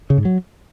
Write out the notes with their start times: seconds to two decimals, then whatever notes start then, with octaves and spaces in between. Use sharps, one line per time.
0.10 C#3
0.18 G#2
0.25 F#3